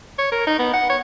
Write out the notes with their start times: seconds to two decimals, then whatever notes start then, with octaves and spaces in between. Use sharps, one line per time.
0.18 C#5
0.32 A#4
0.47 D#4
0.59 B3
0.74 F#5
0.89 C#5